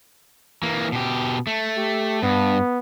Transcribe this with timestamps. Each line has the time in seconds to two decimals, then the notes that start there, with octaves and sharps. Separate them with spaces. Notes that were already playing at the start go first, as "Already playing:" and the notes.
0.63 E3 A#3
0.92 B2 G4
1.47 A3
1.77 G4
2.23 G2 B3